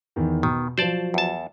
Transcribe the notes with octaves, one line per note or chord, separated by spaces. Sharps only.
E2 D#3
B2 D#3
F3 F#3 C5 D5 A5
E2 A5